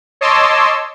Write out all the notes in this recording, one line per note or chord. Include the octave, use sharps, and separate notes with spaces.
C#5 D#5 A5 C6 D6 E6